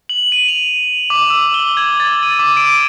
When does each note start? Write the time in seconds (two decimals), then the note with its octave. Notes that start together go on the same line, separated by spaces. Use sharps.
0.09 F#7
0.32 D#7
0.48 F7
1.10 D6
1.30 E6
1.54 G7
1.77 G#6
2.00 A6
2.23 D#7
2.39 D6
2.57 D7